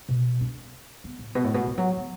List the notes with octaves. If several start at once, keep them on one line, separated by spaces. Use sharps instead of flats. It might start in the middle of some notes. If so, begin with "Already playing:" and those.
B2
D4
B3
A2
B2
A2
B2
E3
F#3
B3